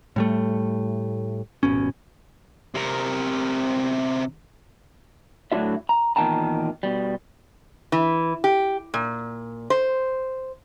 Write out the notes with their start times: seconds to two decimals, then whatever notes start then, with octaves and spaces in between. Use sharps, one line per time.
0.16 A2 G3 A3
1.63 D#1 G#1 B2 C#4
2.75 C3 A#4
5.52 A2 D3 F#3 D4 F4 E5
5.89 A#5
6.16 E2 A#2 D#3 G5 A5 A#5
6.83 B2 G3
7.92 E3
8.44 G4
8.94 A#2
9.70 C5